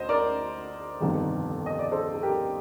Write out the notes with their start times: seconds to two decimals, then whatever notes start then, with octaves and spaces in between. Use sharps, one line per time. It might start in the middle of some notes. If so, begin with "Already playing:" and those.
Already playing: D2 C5 D#5
0.09 A#4 D5
1.00 G1 F2 C3 D#3 G3
1.66 D#5
1.79 D5
1.91 A4 C5
2.14 A4
2.23 G4 A#4